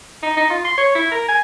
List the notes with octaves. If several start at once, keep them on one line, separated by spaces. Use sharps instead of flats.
D#4
D#4
F4
C6
C#5
E4
A#4
G#5